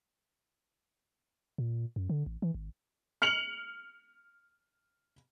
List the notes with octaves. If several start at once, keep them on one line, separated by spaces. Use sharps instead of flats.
A#2
F#2
D3
A1
E3
G#1
F6 C#7 F7 F#7